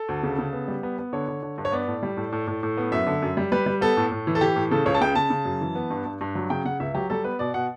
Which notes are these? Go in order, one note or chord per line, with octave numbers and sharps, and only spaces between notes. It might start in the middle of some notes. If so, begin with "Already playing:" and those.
Already playing: A4
D2
C#3
C#3
B3
G3
B3
B3
D3 C#5
D3
D3
G2
C#5
B3 D5
A2
G3
A2
A2
A2
A2
B3
F#2 E5
D3
F#2
G3
G3 B4
G3
B3 A4
A2
A2
E3
A4
E3 G4
A2
C#3 A4
C#2 C#5
A5
C#3 G5
C#3 A5
C#3
F#2
E3
B3
G2
G2
G2
F#3
C#3 G5
C#3 F#5
C#2 E5
F#3 G4
G3 A4
B3 B4
B2 D5
B2 F#5